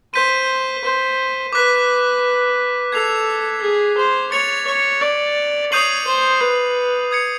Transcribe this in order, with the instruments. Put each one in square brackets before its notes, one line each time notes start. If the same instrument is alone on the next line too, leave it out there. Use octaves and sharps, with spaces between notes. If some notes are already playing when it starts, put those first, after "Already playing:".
[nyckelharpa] C5 [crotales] G6 B6 D#7
[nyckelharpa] C5
[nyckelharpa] B4 [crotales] D6 F#6 B6
[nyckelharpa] A4 [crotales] G#6 C7 F7
[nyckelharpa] G#4
C5
[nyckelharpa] C#5 [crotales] A6 C#7 F7
[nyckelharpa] C#5
D5
[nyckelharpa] C#5 [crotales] D#6 G6 C7 D#7 F#7
[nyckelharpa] C5
B4
[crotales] D#6 G#6 C#7